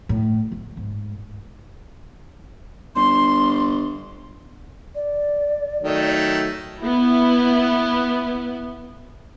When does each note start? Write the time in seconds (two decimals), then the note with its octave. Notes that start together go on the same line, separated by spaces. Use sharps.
0.09 A2
0.52 D2
0.77 G#2
2.96 G1 C6
4.95 D5
5.82 D#3 F#3 A3
6.82 B3 E4